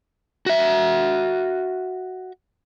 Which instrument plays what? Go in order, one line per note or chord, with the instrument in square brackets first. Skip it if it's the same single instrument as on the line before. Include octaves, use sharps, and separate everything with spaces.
[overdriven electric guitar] F#4 E5